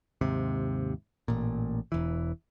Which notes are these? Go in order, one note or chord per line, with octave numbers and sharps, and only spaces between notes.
D#2 G#2 C3
A1 A#2
E1 E3